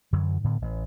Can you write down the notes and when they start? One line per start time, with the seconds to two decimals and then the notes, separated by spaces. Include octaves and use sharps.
0.13 F#2 D3 E3 F#3
0.44 A2 D3 B3
0.62 A1